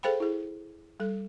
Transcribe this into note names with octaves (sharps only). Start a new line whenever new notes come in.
G#4 A4 C5 F5 G5 B5
E4 G#4
G3 A4